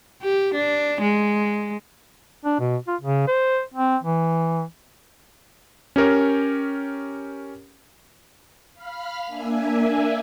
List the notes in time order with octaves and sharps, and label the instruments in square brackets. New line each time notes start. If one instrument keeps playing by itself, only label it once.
[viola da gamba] G4
D4
G#3
[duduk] D4
B2
F4
C#3
C5
C4
E3
[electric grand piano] C#4 G4 A#4 C#5
[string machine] F5 B5 F6
A#3 D4 E5 G#5